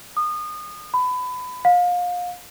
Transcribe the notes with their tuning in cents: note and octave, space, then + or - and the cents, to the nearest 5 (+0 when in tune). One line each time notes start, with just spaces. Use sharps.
D#6 -30
B5 +25
F5 +30